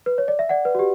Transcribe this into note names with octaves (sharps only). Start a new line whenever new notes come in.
B4
C#5
D5
E5
D5 F#5
B4
F#4
G4